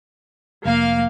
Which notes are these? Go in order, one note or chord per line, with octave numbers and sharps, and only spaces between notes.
F1 A#3 F5